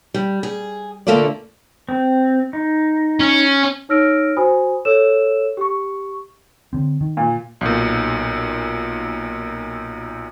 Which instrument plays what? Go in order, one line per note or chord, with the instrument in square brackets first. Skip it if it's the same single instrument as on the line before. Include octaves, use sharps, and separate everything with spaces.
[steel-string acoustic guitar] G3
G#4
A#2 D3 A3 A#3 A4 D5
[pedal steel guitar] C4
D#4
[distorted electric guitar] C#4
[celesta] D#4 C#5 E6 F6 A#6 D7
F#4 C5 G#5 B5 D#6
A4 C#5 E6 E7
G4 C#6
[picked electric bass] D3 C4
D#3
[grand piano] A#2
[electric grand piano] B1 A#2